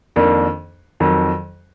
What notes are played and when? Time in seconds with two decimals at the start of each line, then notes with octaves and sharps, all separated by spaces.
0.16 F2 D#3 A#3 D4
1.00 F2 D#3 F#3